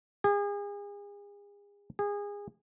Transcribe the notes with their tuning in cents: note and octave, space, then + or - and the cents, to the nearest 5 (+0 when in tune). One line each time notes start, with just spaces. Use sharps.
G#4 -35
G#4 -25